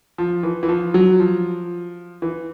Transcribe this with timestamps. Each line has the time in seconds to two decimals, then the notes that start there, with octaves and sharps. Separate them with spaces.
0.18 F3
0.43 E3
0.63 E3
0.69 F3
0.94 F#3
1.20 F3
2.22 E3